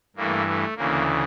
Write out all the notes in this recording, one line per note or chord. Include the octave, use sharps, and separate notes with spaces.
G2 E3 A3 A#3
A3
D2 C#3 E3 A#3